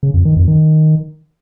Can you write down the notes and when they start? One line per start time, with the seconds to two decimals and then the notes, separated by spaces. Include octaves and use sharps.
0.03 C#3
0.14 F2
0.25 D#3
0.36 F2
0.48 D#3